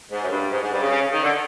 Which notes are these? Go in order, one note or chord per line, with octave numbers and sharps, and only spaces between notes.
G#2
F#2
G2
G#2
G#2
G2
C#3
C#3
D#3
D3